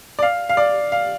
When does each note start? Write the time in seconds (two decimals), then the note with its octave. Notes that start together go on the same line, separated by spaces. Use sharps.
0.19 D5
0.23 F5
0.49 F5
0.57 D5
0.92 F5